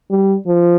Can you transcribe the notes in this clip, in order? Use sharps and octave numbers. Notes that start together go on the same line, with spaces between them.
G3
F3